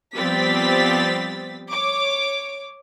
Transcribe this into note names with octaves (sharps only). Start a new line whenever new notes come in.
F3 G3 B3 C4 A6 B6
C#5 D6